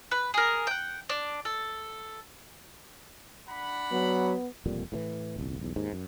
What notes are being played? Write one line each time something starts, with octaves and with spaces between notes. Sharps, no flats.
B4
G#4 A#4
F#5 G5
D4
A4
D4 F#5 B5
F#3 B3
E1 F2 A#2 G3
A2 C3 E3
D#1 C2
B1 E2
D#2 G#2
F#2